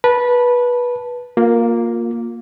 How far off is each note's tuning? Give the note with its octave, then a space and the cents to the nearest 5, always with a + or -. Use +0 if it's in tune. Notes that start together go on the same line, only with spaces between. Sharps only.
B4 -20 A5 +0
A#3 +0 F4 +25